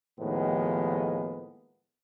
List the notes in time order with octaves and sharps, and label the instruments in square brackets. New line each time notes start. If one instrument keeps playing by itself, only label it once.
[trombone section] D#2 A2 D#3 F3 G#3 B3